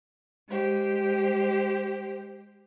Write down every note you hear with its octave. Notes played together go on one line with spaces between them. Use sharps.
G#3 G4 C5